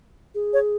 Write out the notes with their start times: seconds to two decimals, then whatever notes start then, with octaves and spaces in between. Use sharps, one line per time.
0.35 G#4
0.53 C#5